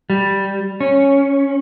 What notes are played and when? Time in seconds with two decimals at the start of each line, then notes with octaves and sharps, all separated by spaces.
0.10 G3
0.80 C#4